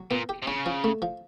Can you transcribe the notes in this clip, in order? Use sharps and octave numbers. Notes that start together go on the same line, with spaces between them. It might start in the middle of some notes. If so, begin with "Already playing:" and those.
Already playing: F#3
A#2 B3
G4
C3
C#3 C#4
F3
A3
F3